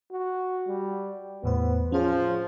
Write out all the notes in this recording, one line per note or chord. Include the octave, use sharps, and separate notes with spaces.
F#4
G3
E2 A2 B3 C5
F3 C#4 G#4 C#5